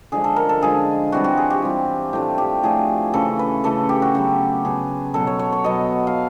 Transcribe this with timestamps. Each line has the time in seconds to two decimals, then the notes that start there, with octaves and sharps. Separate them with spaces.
0.12 D3 F3 G#3 G#4
0.24 A4
0.36 A#4
0.49 A4
0.61 D3 F3 G#3 G#4
1.12 E3 G3 C4 F4 F#4
1.24 F#4
1.37 G#4
1.50 G4
1.62 E3 G3 C4 F4
2.13 A2 F3 A3 D4 G4
2.38 G4
2.63 A2 F3 A3 D4 G#4
3.13 C#3 E3 A3 A4
3.39 B4
3.64 C#3 E3 A3 A4
3.89 G4
4.02 F#4
4.13 C#3 F#3 B3 G4
4.65 C#3 F#3 B3 G#4
5.14 B2 F#3 B3 A4
5.27 C#5
5.39 C#5
5.53 C#5
5.64 B2 F#3 B3 D#5
6.07 F5